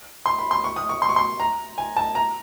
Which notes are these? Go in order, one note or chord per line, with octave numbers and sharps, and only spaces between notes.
C6
B5
C6
C#6
D#6
C#6
C6
C#6
C6
A#5
G#5
A5
A#5